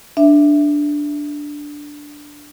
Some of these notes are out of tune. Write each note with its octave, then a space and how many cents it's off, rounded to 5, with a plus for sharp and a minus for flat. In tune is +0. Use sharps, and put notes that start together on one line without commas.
D4 +0 E5 +0